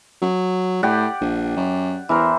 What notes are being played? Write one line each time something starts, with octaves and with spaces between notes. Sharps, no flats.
F#3
A2 G4 D5 F#5
A#1
F#2
E2 E3 A#4 C5